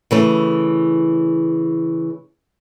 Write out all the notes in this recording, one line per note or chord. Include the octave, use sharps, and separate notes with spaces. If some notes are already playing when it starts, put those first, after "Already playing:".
C#3 E3 A3